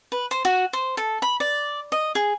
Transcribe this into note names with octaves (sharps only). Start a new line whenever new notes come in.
B4
C5
F#4
C5
A4
B5
D5
D#5
G#4